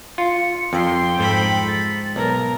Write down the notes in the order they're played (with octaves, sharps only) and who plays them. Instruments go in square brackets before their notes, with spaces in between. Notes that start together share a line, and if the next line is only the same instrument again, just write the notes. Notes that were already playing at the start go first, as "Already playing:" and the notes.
[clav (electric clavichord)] F4 [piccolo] C#7
[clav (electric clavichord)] F2 [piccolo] G5 [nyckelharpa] C6
[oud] G#2 C4 [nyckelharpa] A4 B5
[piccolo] A6
[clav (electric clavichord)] B1 [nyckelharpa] A#4 [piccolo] A#5